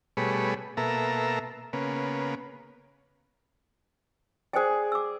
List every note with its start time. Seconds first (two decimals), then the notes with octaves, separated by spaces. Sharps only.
0.17 B2 G3 A3 G#4 C#5 B5
0.77 B2 A#3 A4 E5 A#5
1.73 C#3 A#3 B3
4.53 G#4 C5 D5 G5 G#5
4.92 D6 E6